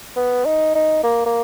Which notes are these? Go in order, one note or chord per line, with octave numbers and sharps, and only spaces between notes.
B3
D#4
D#4
A#3
A#3